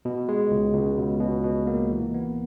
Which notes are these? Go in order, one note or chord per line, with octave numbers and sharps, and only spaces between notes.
B2
G#3
C#2
C#2
B2
B2
B2
A#3
E3
B3